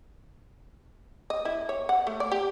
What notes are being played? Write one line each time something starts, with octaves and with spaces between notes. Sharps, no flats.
D#5
E4
C#5
F#5
A3
D5
G4